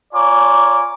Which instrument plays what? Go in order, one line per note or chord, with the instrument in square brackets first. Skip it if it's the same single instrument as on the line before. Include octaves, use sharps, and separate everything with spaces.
[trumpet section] F4 C#5 D5 G#5 A#5 D6